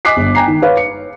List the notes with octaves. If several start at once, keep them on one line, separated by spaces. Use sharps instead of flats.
D#5 G#5 D6 F#6 B6 C7
G1
G5 G#5 A#5 C7
D#3
B4 C#5 F5
C#7